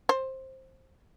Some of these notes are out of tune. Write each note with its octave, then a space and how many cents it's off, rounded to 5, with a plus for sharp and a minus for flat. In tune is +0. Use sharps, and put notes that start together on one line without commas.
C5 +15